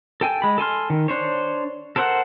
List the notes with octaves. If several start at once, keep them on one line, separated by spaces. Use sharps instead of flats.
A4 G5 G#5
G#3 B5
A4 G#5 C6 F6
D#3
D4 C5 C#5
A4 A#4 C5 C#5 F#5